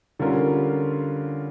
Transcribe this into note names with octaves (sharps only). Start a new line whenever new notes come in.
D3 G3 C#4 F4 A#4